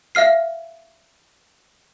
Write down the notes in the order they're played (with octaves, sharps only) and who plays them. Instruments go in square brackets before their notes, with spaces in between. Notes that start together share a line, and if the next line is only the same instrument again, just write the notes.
[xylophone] E5 F5 F6 C7